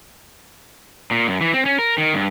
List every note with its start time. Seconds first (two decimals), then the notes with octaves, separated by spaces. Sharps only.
1.11 A#2
1.27 F#2
1.41 E3
1.54 C4
1.66 C#4
1.79 A#4
1.98 D#3
2.14 G2